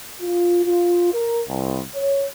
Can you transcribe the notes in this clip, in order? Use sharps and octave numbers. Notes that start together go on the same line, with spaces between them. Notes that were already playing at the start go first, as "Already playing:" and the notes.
F4
F4
A#4
C2
C#5